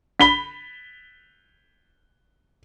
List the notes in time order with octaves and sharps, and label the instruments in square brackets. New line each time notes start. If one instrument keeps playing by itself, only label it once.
[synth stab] D3 B5 [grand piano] B6 G7